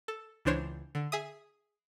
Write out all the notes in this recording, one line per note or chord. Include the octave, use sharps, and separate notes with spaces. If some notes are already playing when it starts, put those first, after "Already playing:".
A4
C#2 E3 D4 C5 C#5 E7
D3
G#4 E5 D#6